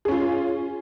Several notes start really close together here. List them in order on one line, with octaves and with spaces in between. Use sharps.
G#4 C#4 F4